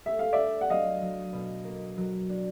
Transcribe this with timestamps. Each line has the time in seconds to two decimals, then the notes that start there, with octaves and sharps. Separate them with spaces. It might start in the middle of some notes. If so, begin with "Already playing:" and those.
0.06 A3 E5
0.19 F5
0.33 D5 E5
0.38 D4
0.61 F#5
0.70 F#3 D#5 F5
1.02 F#3
1.33 B2
1.65 A#3
1.98 F#3
2.29 D4